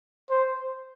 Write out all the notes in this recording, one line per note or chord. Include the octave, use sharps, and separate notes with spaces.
C5